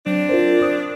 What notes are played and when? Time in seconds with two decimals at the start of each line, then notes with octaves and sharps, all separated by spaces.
0.06 F#3 C4 D4
0.29 F4 A#4 C5
0.62 D#6